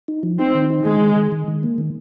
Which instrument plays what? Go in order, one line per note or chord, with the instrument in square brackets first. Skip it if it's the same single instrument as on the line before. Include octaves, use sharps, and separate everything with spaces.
[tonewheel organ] D#4
F3
[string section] C4 [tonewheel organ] D#4
[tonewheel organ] D#3
D#4
[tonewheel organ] D#3 [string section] G#3
[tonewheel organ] D#3
D#3
D#3
D#3
A#3
D#3